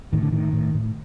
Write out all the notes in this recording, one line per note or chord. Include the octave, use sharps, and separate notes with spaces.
A2 D#3
D3
A2 D#3
A2
A2